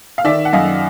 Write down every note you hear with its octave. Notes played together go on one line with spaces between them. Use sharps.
F5
D#3 D5 E5
F#5
F#2 D#5 F5